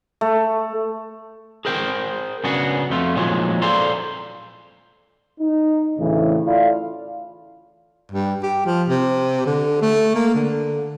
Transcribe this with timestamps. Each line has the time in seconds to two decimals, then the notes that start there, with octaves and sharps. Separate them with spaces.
0.21 A3
1.65 G#4 A#4 C5 G5
2.44 C#3 F#3 B3 D4 F#4 G#4
2.90 F2 A3 F4
3.16 A#2 D#3 F3 F#3 G#3
3.62 A4 C5 D5 F5 A#5 C6
5.40 D#4
5.99 D2 A2 C#3 E3
6.45 E4 F4 A4 D5 F5
8.12 G2
8.43 G4
8.66 F3
8.89 C3
9.46 D3
9.82 A3
10.15 A#3
10.35 D3